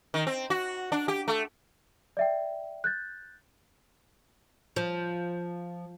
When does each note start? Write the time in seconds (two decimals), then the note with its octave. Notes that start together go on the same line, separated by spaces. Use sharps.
0.14 D#3
0.27 C4
0.50 F#4
0.92 D4
1.08 G4
1.28 A3
2.17 D5 E5 G5
2.84 F#6 G6 A6
4.76 F3